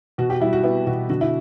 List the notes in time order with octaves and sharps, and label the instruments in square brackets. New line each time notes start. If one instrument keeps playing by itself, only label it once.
[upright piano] B2 F#4
G4
G3 E4
F#4
B3 E4
B2 F#4
D3 F#4
E4